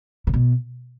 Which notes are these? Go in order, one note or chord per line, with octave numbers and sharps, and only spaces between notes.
C#3
B2